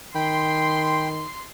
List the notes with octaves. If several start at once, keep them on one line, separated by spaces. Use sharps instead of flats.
D#3 G5 B5 C6